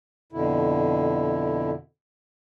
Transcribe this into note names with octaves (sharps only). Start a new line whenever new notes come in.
F2 B2 D3 E4